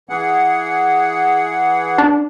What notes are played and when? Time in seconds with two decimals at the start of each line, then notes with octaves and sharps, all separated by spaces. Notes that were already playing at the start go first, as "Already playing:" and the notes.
0.09 E3 G#4 F#5
1.98 D4